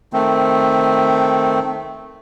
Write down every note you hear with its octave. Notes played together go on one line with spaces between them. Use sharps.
D#3 A3 C4